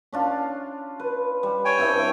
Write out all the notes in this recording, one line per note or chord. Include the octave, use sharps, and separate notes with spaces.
C#4 D4 F4
B4
G3
C#5 G5 G#5
G2 C4 E4